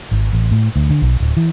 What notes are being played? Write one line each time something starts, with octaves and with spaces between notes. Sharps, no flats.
G#1
A1
A2
D2
D3
B1
D1
E3